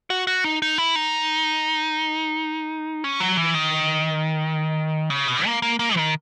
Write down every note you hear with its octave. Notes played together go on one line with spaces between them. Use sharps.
F#4
F#4
D#4
D#4
E4
D#4
C#4
F#3
E3
D#3
C#3
B2
A#3
A#3
A#3
D#3